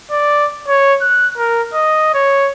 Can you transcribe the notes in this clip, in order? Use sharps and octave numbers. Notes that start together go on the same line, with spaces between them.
D5
C#5
F#6
A#4
D#5
C#5